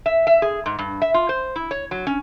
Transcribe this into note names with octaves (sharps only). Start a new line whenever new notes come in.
E5
E5
G#4
G#2
G2
E5
F4
C5
E4
C#5
F#3
C#4